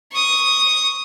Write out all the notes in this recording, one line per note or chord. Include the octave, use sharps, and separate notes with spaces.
C#6 D#6